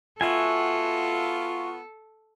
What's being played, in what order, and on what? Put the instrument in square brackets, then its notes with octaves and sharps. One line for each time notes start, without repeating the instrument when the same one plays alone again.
[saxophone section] B3 F4 [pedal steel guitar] F#4 E5 G#5 [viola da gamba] A4